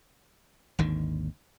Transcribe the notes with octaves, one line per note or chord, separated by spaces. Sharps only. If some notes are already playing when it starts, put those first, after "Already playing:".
G#1 D#2 D3 D#3